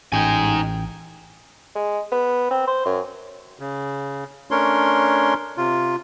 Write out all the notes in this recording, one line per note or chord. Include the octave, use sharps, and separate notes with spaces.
A1 D#4 G5 G#5
G#3
B3
C4
C5
F#2
C#3
A3 C#4 D4 A#4 C#5 C6
C3 F4